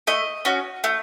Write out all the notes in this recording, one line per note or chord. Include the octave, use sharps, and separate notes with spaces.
A3 D#5
C#4 F#4
A3